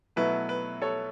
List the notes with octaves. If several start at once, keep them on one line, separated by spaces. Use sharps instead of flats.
B2 F#3 A3 E4 B4
B4
A4 C#5